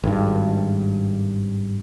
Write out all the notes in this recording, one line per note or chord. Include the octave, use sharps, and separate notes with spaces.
G#1 G2